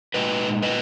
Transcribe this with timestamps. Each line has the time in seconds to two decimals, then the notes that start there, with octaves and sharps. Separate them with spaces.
0.14 A#2 G#3 D#4 B4 D#5
0.62 B4 D#5